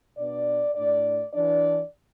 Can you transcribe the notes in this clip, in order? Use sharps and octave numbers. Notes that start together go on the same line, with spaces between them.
B2 B3 D4 D5
A2 A3 D4 D5
E3 D4 D5